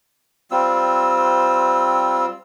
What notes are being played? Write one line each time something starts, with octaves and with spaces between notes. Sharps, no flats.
G3 C4 F4 E6